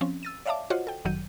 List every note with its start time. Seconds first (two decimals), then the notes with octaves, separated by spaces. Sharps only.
0.01 F3 C4 C#4
0.23 E6 A6 D#7
0.46 C#5 D5 E5 F5 A5 D6
0.70 F4 F#4 C5 C#5 D#5 F#5
0.87 A4 G5
1.05 G1 F#2 D#3 F#3 G6 D#7